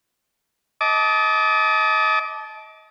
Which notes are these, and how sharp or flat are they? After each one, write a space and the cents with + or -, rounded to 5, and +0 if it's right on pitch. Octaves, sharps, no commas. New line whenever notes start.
D#5 +30 A5 -20 D6 +0